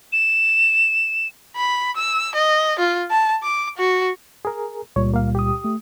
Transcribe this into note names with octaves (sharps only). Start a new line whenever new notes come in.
E7
B5
E6
D#5
F4
A5
D6
F#4
G#4 A#4
C#2 A#2 G3 C#5
A#3 F5
G4 D#6
A3